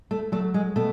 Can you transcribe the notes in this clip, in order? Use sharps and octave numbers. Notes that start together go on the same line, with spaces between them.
A3
F#3 A3
G#3
B2 A3